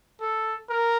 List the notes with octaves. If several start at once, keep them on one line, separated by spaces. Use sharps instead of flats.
A4
A#4